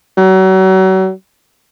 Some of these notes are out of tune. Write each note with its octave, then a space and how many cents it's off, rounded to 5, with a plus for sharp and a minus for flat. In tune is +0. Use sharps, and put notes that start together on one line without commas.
F#3 +35